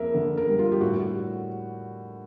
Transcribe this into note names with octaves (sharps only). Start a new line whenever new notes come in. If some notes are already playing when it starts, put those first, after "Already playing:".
Already playing: F2 A#3 A#4 E5
D3
A#4
G3
F4
G4
A2 F#4